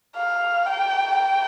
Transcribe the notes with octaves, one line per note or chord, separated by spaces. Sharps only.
F5
G5
G5